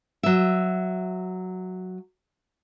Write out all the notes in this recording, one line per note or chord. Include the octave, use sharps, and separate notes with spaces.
F#3 E5